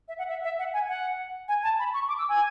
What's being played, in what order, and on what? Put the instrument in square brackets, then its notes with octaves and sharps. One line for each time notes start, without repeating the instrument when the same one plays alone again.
[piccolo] E5
F#5
E5
E5
F#5
G#5
F#5
G#5
A5
B5
C#6
D6
E6
G#5